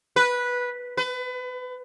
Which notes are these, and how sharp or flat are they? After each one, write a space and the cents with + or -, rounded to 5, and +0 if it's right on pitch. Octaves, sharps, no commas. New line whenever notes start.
B4 -10
B4 +30